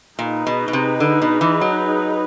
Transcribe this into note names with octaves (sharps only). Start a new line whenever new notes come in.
A#2 D#4 G#4 B4
B2
B2
C3
D3
B2
E3
F#3